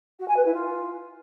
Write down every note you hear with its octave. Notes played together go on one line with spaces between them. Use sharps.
F#4
G#5
B4
E4
F4